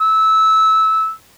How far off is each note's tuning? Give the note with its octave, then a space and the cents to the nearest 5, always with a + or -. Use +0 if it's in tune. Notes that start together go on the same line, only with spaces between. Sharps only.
E6 -20